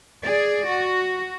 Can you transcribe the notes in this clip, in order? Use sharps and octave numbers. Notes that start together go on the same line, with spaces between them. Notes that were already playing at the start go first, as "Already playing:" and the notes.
G#4 D5
F#4